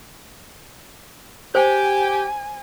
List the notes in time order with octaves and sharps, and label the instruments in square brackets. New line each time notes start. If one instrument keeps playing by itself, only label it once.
[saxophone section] G4 [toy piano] C5 G5 [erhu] G#5